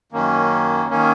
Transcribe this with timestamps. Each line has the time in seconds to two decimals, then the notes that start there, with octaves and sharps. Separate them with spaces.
0.12 F#2 D#3 A#3 C#4
0.90 D#3 A#3 C#4